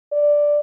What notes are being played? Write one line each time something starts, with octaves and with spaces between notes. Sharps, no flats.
D5